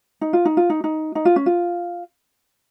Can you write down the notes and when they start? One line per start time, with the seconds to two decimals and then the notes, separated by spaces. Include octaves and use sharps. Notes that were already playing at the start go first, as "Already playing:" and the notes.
0.21 D#4
0.33 F4
0.45 D#4
0.57 F4
0.70 D#4
0.84 D#4
1.15 D#4
1.25 F4
1.36 C#4
1.46 F4